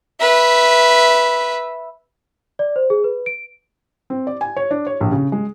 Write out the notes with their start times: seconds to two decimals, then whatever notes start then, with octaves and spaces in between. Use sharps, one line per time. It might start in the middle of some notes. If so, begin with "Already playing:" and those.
0.20 B4 E5
2.59 D5
2.76 C5
2.90 G#4
3.04 B4
3.26 D7
4.10 C4
4.27 D5
4.41 G#5
4.57 C#5
4.71 D4
4.87 C#5
5.01 A#1
5.12 C#3
5.32 G#3